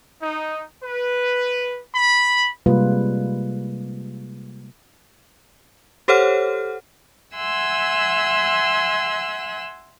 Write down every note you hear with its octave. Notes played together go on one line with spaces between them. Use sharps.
D#4
B4
B5
C3 G3 G#3 A#3 F4 B4
G4 A4 C5 C#5 F#5 F6
E5 F#5 G#5 C6 E6 F#6